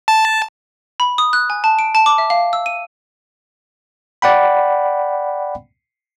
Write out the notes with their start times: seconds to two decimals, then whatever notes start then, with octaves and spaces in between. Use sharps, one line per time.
0.08 A5
1.00 B5
1.18 D#6
1.33 F#6
1.50 G#5
1.64 A5
1.79 D7
1.95 A5
2.06 D6
2.18 E5
2.30 F5
2.53 E6
2.66 D#7
4.22 D5 F#5 G5 B5